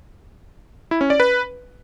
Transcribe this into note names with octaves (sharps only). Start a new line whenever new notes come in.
E4
C#4
D5
B4